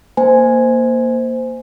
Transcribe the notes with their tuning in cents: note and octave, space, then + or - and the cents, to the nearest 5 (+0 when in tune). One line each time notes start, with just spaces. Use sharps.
A#3 +0 C5 -15 G#5 +0